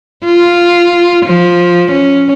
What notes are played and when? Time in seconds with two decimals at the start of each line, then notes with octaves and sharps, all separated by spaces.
0.25 F4
1.26 F3
1.91 C#4